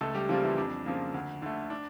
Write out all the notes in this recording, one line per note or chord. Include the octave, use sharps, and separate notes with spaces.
C#2 A3 A4
G3 G4
C#3 F3 G3 A#3 F4
E3 E4
F2 D4
C#3 F3 A#3
D2
D3 A3
D4